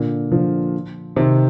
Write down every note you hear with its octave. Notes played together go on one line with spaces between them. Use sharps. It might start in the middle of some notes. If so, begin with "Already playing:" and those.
Already playing: A#2 D3
D3 F3
C3 D#3